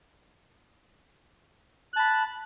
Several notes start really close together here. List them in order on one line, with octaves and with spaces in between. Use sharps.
F#6 A5 B5